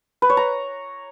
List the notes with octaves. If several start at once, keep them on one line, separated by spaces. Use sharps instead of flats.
B4
C#5
A#5